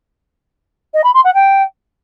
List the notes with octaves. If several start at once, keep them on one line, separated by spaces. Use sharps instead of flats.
D#5
B5
C6
F#5
G5